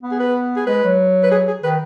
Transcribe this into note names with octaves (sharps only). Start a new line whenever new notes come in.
B3
G#4
B4
G#4
G#3 B4
F#3
B4
G#4
G#4
D#3 B4